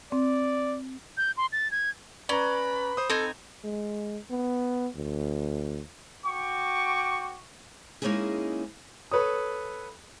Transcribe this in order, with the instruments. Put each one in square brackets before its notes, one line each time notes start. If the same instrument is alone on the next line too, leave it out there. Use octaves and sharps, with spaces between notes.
[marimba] C4 [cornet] D5
[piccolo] G6
C6
A6
G#6
[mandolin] C#4 [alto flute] B4 [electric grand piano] D5 A#5 [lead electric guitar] B5
[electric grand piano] C5 D#6
[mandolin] C4 D#4 G#5 [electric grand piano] A4
[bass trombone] G#3
B3
D2
[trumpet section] F#4 G5 C#6 D6
[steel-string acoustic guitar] G#3 A#3 C#4 D#4 E4 G#4
[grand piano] A4 B4 C#5 D#6